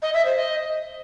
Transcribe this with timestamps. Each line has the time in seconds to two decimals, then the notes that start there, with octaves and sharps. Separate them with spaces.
0.02 D#5
0.14 E5
0.25 C5
0.37 D#5